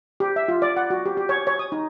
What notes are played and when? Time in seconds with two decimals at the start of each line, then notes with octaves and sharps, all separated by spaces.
0.20 G4
0.36 E5
0.48 F4
0.62 D5
0.77 F#5
0.90 F#4
1.06 G4
1.17 G4
1.29 C#5
1.47 C#5
1.59 D#6
1.72 D#4